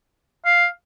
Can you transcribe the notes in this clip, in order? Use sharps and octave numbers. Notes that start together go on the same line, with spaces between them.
F5